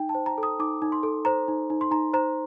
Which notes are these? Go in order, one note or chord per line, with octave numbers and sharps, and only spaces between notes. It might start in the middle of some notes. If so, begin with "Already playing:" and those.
Already playing: D#4 G5
A5
C5
A#5
A4
D#6
D#4 D6
D#4
C6
A4
C5 A#5
D#4
D#4
C6
D#4 A#5
C5 A#5